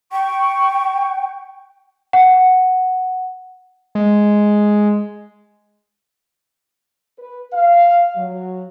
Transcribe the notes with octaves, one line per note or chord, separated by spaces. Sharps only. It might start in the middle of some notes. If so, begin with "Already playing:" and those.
G5 C#6
F#5
G#3
B4
F5
F#3